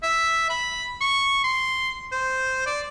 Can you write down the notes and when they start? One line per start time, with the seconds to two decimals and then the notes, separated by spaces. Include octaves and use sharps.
0.03 E5
0.50 B5
1.01 C#6
1.44 C6
2.12 C5
2.66 D5